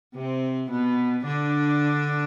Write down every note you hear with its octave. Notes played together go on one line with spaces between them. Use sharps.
C3 C4
B2 B3
D3 D4